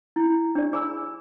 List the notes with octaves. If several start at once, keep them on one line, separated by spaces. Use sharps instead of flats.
E4
D4 G4 D5
G#4 G#5 B5 E6